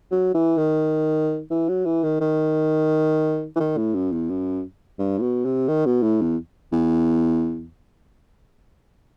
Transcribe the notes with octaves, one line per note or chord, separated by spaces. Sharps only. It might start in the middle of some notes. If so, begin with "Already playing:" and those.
F#3
E3
D#3
E3
F#3
E3
D#3
D#3
E3
D#3
A2
F#2
E2
F#2
G2
A2
B2
C3
D#3
B2
A2
E2
E2